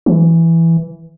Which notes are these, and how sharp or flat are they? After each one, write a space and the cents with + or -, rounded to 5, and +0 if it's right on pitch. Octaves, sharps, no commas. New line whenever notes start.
E3 +5